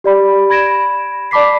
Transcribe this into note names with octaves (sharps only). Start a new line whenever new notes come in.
G4 D5 B5
B5 G#6 A#6 D7 E7
D5 A5 B5 D6 B6 C7